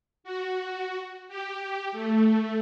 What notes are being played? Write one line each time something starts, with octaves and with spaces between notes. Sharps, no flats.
F#4
G4
A3